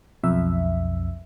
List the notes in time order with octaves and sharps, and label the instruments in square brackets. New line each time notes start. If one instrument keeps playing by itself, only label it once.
[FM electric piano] B1 F2 E5